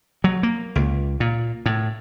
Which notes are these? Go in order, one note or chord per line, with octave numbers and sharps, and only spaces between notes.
F#3
A#3
C#2
A#2
A2